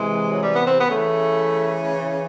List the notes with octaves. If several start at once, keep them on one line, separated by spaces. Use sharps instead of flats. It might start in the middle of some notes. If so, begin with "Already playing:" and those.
Already playing: C3 E3 G#3
F#3
G3
B3
C4
B3
C#3 E3 A3